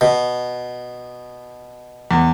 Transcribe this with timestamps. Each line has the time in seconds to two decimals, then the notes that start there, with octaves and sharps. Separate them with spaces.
0.01 B2
2.11 E2